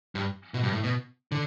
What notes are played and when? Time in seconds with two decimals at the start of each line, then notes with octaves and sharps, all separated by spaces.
0.15 G2
0.54 B2
0.63 G2
0.73 A2
0.84 B2
1.32 D3